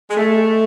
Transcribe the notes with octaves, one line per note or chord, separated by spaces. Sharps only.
G#3
A3